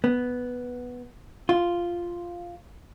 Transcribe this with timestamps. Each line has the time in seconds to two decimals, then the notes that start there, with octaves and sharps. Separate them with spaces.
0.04 B3
1.49 F4